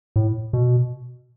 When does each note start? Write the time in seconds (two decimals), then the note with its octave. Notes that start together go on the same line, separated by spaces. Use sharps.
0.16 A2
0.53 B2